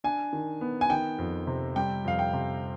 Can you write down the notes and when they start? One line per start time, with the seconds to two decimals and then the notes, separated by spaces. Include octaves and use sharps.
0.04 D4 G#5
0.33 D#3
0.61 B3
0.81 G#5
0.90 D#3 G5
1.18 F2
1.47 C3
1.76 G3 G5
2.04 F2 F5
2.19 G5
2.33 C3